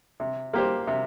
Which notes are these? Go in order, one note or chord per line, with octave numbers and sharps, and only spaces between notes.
C3
A#3 G4 C5
C3